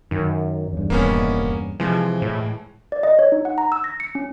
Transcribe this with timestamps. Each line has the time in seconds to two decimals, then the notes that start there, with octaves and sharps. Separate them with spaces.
0.11 F#2 D#3
0.73 E2 G2
0.90 D#1 A#3 B3 C#4
1.80 C3 E3 F3 G#3
2.22 A2
2.92 D5
3.03 D#5
3.19 C#5
3.32 D#4
3.45 F#5
3.58 A#5
3.72 E6
3.84 A#6
4.00 C#7
4.15 C#4